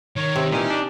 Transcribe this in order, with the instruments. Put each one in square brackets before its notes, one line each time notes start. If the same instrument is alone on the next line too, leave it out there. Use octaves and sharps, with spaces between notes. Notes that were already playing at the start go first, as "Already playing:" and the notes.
[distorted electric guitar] D#3 A#4 [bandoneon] C#5
[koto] C3
[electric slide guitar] A#2 E3 [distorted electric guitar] C#4 G#5 [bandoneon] D#4
[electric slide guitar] D4